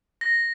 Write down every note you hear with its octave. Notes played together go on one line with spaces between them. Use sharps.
A#6